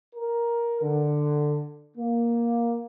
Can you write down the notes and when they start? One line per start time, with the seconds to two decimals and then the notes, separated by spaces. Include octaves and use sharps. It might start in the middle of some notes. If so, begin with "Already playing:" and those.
0.15 A#4
0.82 D3
1.96 A#3